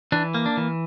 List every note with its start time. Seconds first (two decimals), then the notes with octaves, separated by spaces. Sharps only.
0.12 E3 D4
0.34 A#3
0.46 D4
0.57 E3